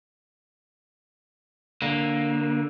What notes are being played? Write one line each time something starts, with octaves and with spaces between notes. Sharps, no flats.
D3 A#3